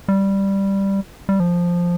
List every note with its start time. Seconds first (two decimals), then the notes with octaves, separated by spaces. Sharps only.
0.08 G3
1.29 G3
1.40 F3